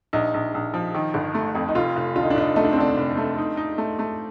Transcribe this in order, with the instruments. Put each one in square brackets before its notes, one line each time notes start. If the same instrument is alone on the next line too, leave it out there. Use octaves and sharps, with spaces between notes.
[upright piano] A#1 [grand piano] D#4
[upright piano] A#1
A#1
F3
D#3
G1
A3
F2
[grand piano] D#4
[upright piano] F1 [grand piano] F4
[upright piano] F1
[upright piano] D3 [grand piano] F4
[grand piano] D#4
D4
[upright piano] F1 [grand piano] D#4
[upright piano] A3 [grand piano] D#4
[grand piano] D4
C4
[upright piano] D3 [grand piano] D4
[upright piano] F1
A3
D#4
D#4
A3
A3